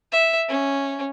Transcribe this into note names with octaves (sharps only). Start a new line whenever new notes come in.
E5
C#4